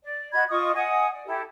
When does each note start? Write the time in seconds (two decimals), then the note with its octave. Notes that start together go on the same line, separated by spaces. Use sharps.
0.03 D5
0.33 F#4 D#5 B5 G#6
0.49 F4 D#5 C#6 D#6
0.75 D#5 F#5 G#5 D#6
1.10 D5
1.26 E4 G4 A4